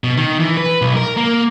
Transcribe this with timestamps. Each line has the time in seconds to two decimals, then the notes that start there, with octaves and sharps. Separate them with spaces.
0.04 B2
0.17 D#3
0.40 E3
0.57 B4
0.82 B1
0.96 A#4
1.17 A#3